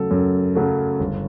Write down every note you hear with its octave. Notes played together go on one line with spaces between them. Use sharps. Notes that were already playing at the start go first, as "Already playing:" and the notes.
Already playing: F#2 C#3 F#3 A3 A4
F#2
C#3 F#3 A3
G1